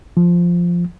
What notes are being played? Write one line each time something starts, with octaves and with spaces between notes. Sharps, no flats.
F3